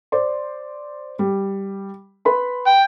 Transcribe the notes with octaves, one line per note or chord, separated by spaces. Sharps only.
C5 D5 C6
G3
B4 B5 C6
G5